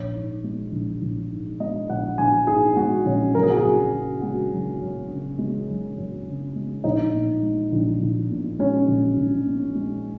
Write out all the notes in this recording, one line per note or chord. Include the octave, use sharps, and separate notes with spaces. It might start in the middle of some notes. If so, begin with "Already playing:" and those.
Already playing: A#1 C#5
G#2
G#3
A#1
A#1
G#2
G#3 D#5
A#1 F#5
A#1 G#5
G#2 G#4
G#3 F#4
A#1 C#4
F#1 A#4
G#4
F#4
G#4
F#2
C#3
G#3 F#4
F#1
F#2
C#3
G#3
F#1
F#2
C#3
G#3
A#1 D#4
A#2
G#3
A#1
A#1
A#2
G#3 C#4
A#1
A#1
A#2
G#3